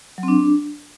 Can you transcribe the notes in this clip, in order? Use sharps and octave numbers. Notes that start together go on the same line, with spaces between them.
F#3
C4
D4